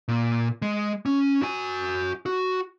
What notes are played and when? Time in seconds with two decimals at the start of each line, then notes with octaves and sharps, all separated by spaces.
0.08 A#2
0.62 G#3
1.06 C#4
1.42 F#4 G#5
2.26 F#4